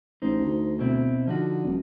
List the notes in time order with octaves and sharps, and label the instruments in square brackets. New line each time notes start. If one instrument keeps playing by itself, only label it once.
[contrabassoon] A1 [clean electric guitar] D#4 C5
[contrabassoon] D2
[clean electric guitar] B2 C4 E4
[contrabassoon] D3 [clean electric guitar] F3 D#4 F#4
[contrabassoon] D#1